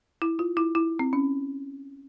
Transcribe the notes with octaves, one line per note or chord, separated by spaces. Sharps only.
E4
F4
E4
E4
C4
C#4